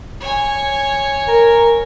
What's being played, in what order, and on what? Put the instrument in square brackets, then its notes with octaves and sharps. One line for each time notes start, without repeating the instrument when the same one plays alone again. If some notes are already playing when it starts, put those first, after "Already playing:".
[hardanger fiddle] C#5 G#5
[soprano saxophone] A#4